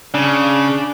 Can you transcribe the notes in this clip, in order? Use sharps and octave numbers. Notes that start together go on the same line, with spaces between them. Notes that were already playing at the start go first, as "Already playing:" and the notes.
C#3 D4